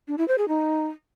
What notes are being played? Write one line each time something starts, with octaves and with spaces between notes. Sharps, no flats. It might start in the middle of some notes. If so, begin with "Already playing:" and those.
D4
E4
C5
G#4
D#4